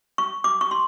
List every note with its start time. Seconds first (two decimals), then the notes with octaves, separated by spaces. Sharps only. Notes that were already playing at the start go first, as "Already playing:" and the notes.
0.18 C#6
0.44 D6
0.61 C#6
0.71 C6